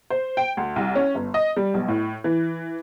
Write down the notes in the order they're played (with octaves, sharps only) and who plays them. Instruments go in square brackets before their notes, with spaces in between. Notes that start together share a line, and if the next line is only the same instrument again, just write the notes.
[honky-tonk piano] C5
G5
D2
C2
C#4
G1
D#5
G3
B1
A2
E3